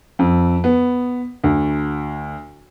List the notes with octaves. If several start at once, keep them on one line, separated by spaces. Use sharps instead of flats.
F2
B3
D2